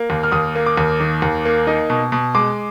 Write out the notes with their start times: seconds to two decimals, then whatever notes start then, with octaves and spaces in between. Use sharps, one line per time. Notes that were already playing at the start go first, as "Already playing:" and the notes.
Already playing: A#3
0.10 D#2
0.23 F6
0.32 D#2 D#6
0.55 A#3
0.66 D6
0.77 D#2
1.00 D#3
1.22 D#2
1.45 A#3
1.67 D#4
1.90 B2
2.12 B2
2.35 G#3 D6